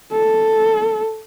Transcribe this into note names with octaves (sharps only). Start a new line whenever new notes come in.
A4